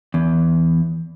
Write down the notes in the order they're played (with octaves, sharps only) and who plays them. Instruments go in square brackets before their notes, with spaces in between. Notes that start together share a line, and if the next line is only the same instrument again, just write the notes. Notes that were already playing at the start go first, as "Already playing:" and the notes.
[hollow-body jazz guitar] E2